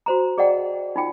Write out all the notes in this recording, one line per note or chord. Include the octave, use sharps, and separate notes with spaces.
F#4 C5 A#5
G#4 D5 D#5 F#5 G5
D#4 F4 G5